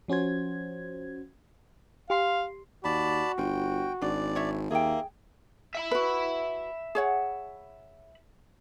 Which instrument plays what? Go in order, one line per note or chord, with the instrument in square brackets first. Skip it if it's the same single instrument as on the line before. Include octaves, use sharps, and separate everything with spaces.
[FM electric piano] F3 C#4 F#4 C5 G#6
[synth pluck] G4 C6 C7 [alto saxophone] F5
[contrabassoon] D#2 [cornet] F#4 [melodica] D5 A5 B5
[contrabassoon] G1 [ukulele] F4 [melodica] G5
[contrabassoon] G#1 [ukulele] D4 [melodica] D5
[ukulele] D4 C#5 E5
[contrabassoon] D#2 [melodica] A#3 [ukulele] G#4 G5 [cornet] E5
[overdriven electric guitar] E5 B5
[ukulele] F#4 B4
G#4 C#5 F#5